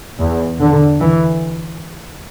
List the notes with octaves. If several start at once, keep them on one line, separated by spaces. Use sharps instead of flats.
E2
D3
E3